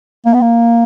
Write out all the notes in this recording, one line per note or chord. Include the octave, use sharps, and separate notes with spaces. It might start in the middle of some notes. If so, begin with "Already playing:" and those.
A#3
B3
A#3